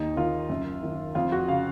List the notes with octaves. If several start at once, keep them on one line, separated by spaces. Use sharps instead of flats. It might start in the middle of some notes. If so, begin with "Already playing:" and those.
Already playing: D#2 D#4
D#3 F4
F#2
D#3
F2 F4
F#4
C#3 F5